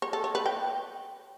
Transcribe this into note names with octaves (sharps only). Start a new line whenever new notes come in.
C#5
A4
C#5
B4
G5